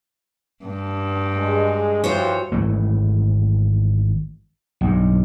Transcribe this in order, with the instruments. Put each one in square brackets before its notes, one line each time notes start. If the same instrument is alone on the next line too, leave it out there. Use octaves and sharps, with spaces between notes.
[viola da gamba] G2
[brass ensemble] G#3
[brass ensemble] E3 F3 G4 [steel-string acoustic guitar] F#4 C5 C#5
[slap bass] G#1 E3 A3
B1 G2